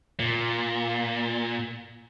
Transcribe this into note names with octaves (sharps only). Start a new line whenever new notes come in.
A#2